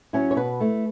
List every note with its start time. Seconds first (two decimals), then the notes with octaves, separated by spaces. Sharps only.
0.13 F#3 C#4 E4
0.31 C#5
0.36 B2 B4
0.60 A3 E4